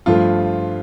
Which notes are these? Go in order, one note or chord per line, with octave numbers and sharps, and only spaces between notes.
G2 F3 A3 F4